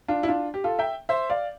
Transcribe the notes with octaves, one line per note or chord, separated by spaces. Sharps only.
D4 F4
E4
D4 F4
G4
F4 A4
E5 G5
C5 E5
D5 F5